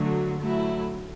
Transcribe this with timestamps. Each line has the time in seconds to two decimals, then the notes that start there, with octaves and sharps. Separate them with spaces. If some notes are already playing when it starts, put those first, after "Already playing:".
Already playing: D3 F#3 A3
0.41 F#3 A3 E4